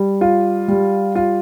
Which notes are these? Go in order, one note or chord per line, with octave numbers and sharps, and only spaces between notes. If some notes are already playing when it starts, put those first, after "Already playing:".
Already playing: G3
F4
G3
F4